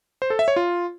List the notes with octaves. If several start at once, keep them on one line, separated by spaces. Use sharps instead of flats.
C5
A4
E5
C#5
F4